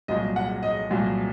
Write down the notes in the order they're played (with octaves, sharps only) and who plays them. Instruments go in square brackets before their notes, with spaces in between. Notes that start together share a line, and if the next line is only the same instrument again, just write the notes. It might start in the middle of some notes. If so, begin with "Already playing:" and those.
[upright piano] C2 A#2 F#3 D#5
F#5
D#5
C2 A#2 F#3